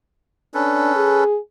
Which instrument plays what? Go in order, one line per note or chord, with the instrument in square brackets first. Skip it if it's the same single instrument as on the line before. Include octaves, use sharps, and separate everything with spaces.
[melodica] C#4 A4 B4 [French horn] D4
[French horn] G#4